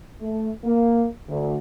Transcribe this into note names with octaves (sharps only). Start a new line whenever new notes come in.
A3
A#3
D2